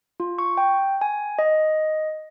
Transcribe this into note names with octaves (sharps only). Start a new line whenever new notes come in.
F4
C#6
G5
G#5
D#5